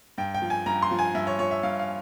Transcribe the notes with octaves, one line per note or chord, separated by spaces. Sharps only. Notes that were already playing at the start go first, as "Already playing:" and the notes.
G2 G5
G5
F3
G#5
G2 A#5
C6
F3
G#5
G2 E5
C#5
F3 C#5
E5
G2 F5
F5